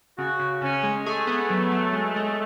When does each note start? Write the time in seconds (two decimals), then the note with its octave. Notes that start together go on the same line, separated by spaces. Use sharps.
0.18 C#3 F#4
0.40 C#3
0.62 C#3 C#4
0.83 G#3
1.06 A3 G#4
1.27 B3
1.50 F#3
1.72 F#3
1.93 G#3
2.16 G#3